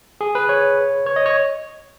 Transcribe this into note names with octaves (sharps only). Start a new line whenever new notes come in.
G#4
B4
C#5
C#5
D#5
C#5